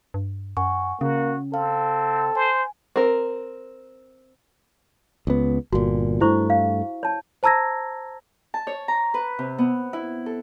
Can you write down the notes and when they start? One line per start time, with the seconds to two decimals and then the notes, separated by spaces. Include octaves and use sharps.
0.14 G2
0.57 F#2 F#5 G#5 C#6
1.01 C#3 A#3 C#4 F#4
1.54 C4 A4 F5
2.35 C5 G#5
2.96 C4 A#4
5.27 C#2 B3
5.72 G1 A#2 F#4
6.21 G2 A3 E4 C5 C#6
6.50 F5
7.03 C#5 A5
7.43 C5 A5 A#5 E6 G#6 A#6
8.54 A5
8.67 C#5
8.88 A#5
9.14 B4
9.39 C3
9.58 B3
9.93 E4
10.26 A4